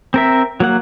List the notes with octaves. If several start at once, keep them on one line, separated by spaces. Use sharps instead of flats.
C4 A#4 E5
F#3 A#3 F#5